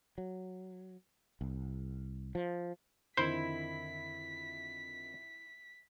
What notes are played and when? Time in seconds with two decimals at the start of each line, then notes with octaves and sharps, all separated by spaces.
0.18 F#3
1.41 C2
2.35 F3
3.17 F2 D3 D#3 E4 C5 B6